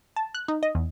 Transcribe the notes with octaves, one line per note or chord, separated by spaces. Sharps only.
A5
F#6
D#4
D#5
E2